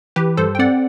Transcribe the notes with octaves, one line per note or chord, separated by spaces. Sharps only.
E3 G4 B4
G2 A4 C5
G5
C4 D5 F#5